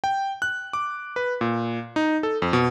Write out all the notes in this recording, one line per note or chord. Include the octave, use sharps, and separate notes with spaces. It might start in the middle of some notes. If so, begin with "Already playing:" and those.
G5
F#6
D6
B4
A#2
D#4
A4
F2
B2